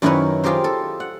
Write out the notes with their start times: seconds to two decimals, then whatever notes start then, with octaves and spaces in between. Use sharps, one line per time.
0.02 F#2 D#3 E4 A#4 B4 C#5
0.44 F4 G4 G#4 A#4 C5
0.64 A4
1.00 F#5